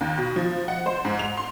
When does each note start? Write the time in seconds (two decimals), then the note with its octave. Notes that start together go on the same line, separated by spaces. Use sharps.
0.01 D#2
0.18 B2
0.36 F3
0.68 F#5
0.86 C5
1.05 G#2
1.19 F7
1.37 C6